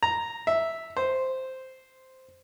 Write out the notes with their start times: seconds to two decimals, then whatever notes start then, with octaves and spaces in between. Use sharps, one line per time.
0.03 A#5
0.47 E5
0.97 C5